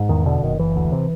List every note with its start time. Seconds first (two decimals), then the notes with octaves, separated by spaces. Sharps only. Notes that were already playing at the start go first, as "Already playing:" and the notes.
Already playing: G#2
0.09 E2 D#3
0.26 B2 D3
0.42 F#1 D#3
0.59 F#1 E3
0.76 D2
0.92 C3